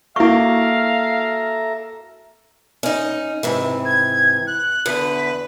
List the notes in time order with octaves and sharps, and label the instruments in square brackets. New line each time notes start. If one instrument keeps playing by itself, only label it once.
[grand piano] A#3 F#4 [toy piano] E4 C#6 [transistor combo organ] A4 E5 A#5 [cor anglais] F5
[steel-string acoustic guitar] C#4 D#4
G#2 C3 E3
[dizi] G#6
F#6
[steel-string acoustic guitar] E2 D3 [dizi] B4